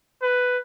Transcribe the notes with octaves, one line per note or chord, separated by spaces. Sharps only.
B4